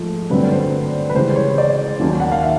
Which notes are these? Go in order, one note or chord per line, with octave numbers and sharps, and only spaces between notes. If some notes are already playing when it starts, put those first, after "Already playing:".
Already playing: G#2 F3 A3
G2 D3 F#3 A3 C4 B4
C5
B4
C#2 C#3 E3 G3 C5
C#5
D5
D#2 D#3 F#3 A#3 C#4
F#5
F5
E5